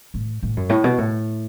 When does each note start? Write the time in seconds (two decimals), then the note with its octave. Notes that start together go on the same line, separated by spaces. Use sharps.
0.14 A2
0.43 A2
0.57 F#2
0.70 A2
0.84 B2
0.98 A2